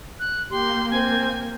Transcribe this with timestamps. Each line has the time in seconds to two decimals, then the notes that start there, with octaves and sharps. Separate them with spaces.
0.19 F#6
0.51 A#3 G4 C6
0.91 C4 G#5